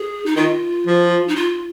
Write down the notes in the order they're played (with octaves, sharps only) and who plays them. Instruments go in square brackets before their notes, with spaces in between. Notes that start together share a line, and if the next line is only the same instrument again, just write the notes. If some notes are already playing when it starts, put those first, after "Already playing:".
Already playing: [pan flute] G#4
D#4
[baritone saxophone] D#3 [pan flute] F4
[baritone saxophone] F3
[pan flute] D#4
F4